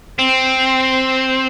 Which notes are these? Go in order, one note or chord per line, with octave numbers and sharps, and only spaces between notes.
C4